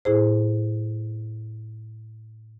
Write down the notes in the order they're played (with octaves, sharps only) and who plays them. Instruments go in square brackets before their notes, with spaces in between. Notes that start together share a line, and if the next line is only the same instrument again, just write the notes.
[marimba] A2 E4 G#4 C5